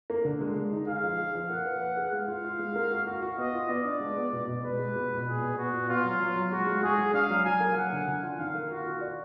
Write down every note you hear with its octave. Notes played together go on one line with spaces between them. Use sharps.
A#3
D3
G#3
G#3
D#4
G#4 F5
F3
G#4
F3
A#3 F#5
B4
B4
G#4
G#3 F5
F4
F4
G#3
A#3
F#4
F#4
F#4
B3 D#5
F4
B3 D5
D4
G#3
B3
B2
B2
G#3 B4
G#3
B2
B2
A#2 G#4
B3
B3 F#4
A#2
B3 F4
F#3
F#3
F#3
G#3 F#4
G#3
G#3 G#4
G#3
D4 F5
F#3
F#3 G#5
A#3
F#3 F#5
D3
D3
F4
D#3 F5
A#3
F4 F#4
F4
D5